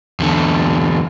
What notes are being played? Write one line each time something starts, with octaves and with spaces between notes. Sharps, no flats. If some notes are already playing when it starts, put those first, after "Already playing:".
E2 D3